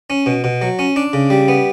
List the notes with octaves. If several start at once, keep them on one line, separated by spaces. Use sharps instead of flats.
C#4
B2
B2
F#3
C#4
D4
C#3
G3
B3